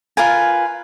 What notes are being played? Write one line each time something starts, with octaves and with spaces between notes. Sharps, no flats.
F4 A#4 B4 G#5